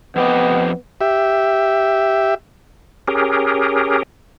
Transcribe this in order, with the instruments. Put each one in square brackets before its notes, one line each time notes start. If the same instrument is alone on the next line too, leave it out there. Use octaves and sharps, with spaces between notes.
[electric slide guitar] F2 G4 D#5 [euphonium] B3
[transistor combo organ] G4 E5
[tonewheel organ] C#4 G4 G#4 A#4